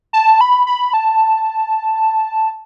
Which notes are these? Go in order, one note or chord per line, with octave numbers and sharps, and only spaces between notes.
A5
B5
B5
A5